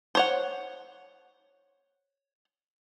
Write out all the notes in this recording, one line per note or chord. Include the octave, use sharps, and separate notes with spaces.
C5 C#5 F#5